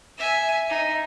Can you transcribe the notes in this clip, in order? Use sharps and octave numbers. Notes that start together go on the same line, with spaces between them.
E5 G#5
D#4